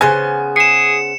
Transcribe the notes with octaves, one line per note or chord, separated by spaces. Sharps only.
C#3 B3 C5 G#5
G#4 C#7 E7